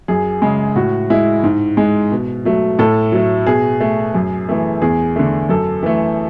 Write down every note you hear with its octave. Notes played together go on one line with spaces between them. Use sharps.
F#2 G#4
C#3 G#3
A2 F#4
G#3 E4
G#2
G#3
B2
F#3 A3
A2 A4
F#3 A3
B2 G#4
A3
F#2
E3 A3
E2 G#4
D3 A3
F#2 A4
E3 A3